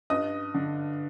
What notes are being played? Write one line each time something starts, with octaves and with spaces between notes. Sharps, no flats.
G2 D#5 D#6
D3